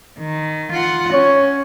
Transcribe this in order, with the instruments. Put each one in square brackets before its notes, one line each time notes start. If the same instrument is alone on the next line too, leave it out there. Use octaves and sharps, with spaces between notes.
[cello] D#3
F4 F#5
[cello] C#4 [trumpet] C#5